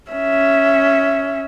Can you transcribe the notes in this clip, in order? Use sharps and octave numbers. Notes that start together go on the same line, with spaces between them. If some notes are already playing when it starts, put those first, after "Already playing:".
C#4 E5